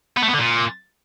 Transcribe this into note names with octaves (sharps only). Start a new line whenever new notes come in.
B3
A3
B3
D3
A#2